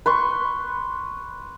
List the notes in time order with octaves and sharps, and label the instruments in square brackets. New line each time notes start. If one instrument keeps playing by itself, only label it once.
[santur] B4 C6 C#6